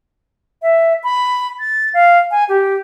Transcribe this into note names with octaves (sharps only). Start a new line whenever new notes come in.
E5
B5
A6
F5
G#5
G4